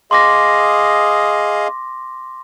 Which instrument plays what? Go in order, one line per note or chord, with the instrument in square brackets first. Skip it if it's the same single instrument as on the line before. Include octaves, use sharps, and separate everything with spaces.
[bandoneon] G#4 D#5 F5 [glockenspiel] C6 D6 A#6